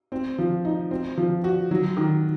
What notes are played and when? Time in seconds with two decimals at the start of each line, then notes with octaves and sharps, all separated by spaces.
0.12 C4
0.38 F3
0.65 D#4
0.91 C4
1.17 F3
1.44 F#4
1.71 F#3
1.97 D#3